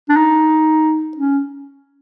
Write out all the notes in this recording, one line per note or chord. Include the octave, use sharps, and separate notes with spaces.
D4
D#4
C#4